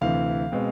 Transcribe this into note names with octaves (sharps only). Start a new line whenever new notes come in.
D2 C3 E3 F5
B2 G#3 C4